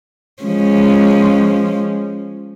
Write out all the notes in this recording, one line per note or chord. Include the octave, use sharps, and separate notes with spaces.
F3 G#3 C#4